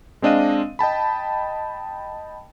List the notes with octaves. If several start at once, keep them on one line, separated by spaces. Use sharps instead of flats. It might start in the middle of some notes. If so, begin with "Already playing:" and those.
G#3 C4 D4 D#5 F5 D#7
D#5 G5 A5 B5